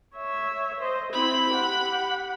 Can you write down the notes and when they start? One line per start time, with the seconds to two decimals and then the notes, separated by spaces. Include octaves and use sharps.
0.16 C#5 E5
0.80 C5 D#5
1.13 C4 E4 B5
1.50 G4 F#5